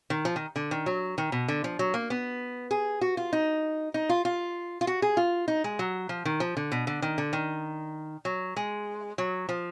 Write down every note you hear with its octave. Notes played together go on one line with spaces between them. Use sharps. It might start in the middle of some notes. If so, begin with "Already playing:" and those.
D#3
F3
D#3
D3
D#3
F#3
D#3
B2
D3
F3
F#3
A#3
B3
G#4
F#4
F4
D#4
D#4
F4
F4
F4
F#4
G#4
F4
D#4
G#3
F#3
F3
D#3
F3
D3
B2
D3
D#3
D3
D#3
F#3
G#3
F#3
F3